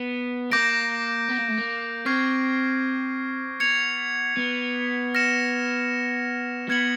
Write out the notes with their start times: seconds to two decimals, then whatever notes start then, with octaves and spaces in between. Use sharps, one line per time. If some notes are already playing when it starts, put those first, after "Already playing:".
Already playing: B3
0.51 A#3 D6 G6 A#6 D7
1.29 B3
1.38 A#3
1.48 A3
1.57 A#3
2.06 C4 C#6 F6 G#6 C7
3.60 B3 G#6 C#7 F7
4.37 B3
5.15 F6 A#6 C#7 E7
6.69 B3 F6 G#6 C#7 F#7